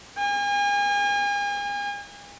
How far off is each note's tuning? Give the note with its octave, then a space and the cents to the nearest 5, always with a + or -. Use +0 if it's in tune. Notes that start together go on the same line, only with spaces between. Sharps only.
G#5 -40